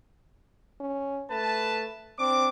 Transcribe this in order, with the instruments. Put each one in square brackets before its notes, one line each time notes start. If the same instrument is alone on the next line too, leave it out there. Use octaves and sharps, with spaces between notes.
[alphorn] C#4
[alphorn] A3 [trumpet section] B4 A5
[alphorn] C4 [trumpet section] D4 D6